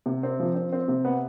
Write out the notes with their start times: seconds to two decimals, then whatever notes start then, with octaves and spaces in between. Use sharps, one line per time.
0.06 C3
0.23 C4
0.40 F3
0.55 C4
0.72 C4
0.88 C3
1.05 B3